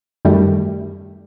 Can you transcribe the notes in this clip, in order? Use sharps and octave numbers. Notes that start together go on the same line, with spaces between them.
F#2 D#3 G3 A3